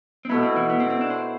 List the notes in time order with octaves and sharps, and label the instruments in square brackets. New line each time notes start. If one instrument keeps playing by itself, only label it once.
[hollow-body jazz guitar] C4
[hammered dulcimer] B2 A3 E4 [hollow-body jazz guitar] B3
[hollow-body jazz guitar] C4
E3
B3
C4
C4
D4
C5